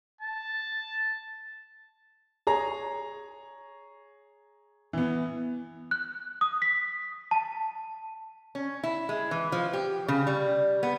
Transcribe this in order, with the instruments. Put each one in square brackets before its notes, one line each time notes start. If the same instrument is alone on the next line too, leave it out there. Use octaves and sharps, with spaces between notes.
[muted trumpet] A5
[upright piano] G#4 C#5 A#5
E3 B3
[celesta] F#6
D#6
B6
A5
[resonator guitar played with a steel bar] C#4
E4
G#3
E3
F3
G4
C#3
G3
B3